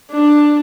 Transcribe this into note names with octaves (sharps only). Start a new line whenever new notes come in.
D4